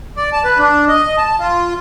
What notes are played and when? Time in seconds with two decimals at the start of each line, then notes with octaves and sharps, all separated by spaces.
0.17 D5
0.33 A5
0.44 B4
0.59 D4
0.88 D#5
1.18 A5
1.39 F4